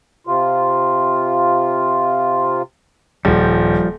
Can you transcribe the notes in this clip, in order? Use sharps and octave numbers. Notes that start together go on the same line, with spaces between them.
C3 F4
D#1 F3 G3